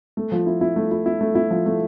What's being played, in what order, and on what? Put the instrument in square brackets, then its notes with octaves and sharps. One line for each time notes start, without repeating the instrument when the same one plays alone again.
[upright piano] A3
F3
E4
E4
A3
E4
E4
A3
E4
F3
A3